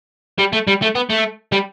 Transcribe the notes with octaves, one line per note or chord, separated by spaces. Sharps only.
G3
A3
G3
A3
B3
A3
G3